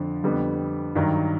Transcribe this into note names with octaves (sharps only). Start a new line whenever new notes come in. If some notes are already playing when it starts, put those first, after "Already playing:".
Already playing: F2 D3 F3
F2 D3 G3 B3
G2 D#3 F#3